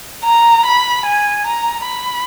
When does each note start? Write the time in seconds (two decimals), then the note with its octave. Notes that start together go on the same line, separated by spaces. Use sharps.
0.24 A#5
0.66 B5
1.06 G#5
1.47 A#5
1.87 B5